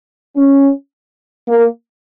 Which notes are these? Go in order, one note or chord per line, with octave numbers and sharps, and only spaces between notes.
C#4
A#3